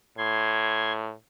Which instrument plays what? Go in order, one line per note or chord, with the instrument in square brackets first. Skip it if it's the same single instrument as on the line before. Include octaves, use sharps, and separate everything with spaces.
[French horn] A2 [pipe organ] C6 G#6